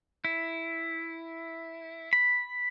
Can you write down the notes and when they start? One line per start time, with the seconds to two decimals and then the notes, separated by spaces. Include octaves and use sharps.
0.25 E4
2.13 B5